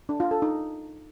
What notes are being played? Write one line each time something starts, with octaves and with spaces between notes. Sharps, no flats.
D4
F4
A4
D#4